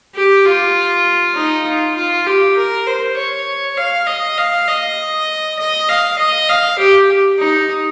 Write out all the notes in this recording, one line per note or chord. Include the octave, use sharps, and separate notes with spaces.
G4
F4
D#4
F4
F4
G4
A#4
C5
C#5
F5
D#5
F5
D#5
D#5
F5
D#5
F5
G4
D#4